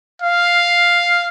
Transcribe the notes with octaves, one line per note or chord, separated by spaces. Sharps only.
F5